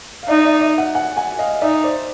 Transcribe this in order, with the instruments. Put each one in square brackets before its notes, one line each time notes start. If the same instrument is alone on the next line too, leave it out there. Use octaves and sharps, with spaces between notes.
[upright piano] F5
[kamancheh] D#4 [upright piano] D5 E5
[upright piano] D5 E5
D5 E5
E5 F#5
F#5 G#5
F#5 G#5
D#5 F5
[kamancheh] D#4 [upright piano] D5 E5
[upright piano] C5 D5